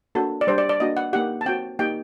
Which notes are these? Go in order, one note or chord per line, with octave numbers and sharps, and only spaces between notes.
A#3 D4 F#4 A4
D5
G3 D4 G4 C5
D5
D5
A#3 D4 F#4 D#5
F#5
A#3 D#4 G4 F#5
A5
C4 F#4 G5
A#3 D#4 G4 G5